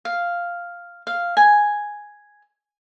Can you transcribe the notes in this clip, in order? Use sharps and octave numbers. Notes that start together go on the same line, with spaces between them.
F5
F5
G#5